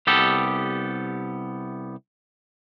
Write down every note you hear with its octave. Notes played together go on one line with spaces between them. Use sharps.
C2 B3 G4 A4